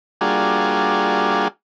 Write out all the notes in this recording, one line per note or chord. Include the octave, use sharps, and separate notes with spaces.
G3 A#3 D4 F4 F#4 G#4